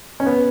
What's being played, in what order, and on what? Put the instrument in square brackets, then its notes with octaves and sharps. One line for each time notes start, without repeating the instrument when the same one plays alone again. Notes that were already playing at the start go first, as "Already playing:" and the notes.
[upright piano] C#4
B3